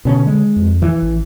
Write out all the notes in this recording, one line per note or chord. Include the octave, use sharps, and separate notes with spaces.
B2 D3 C#4
G#3
F2
E3
A1